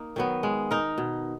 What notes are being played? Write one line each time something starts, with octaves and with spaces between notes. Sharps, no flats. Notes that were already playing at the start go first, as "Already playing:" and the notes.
Already playing: A#3 D#4
D#3 F#3 B3
G#3
D#4 A#4
B2